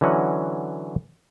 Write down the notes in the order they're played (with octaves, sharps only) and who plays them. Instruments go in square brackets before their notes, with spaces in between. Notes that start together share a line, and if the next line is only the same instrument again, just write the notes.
[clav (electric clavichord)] D3 E3 F#3 C#4 D#5 F#5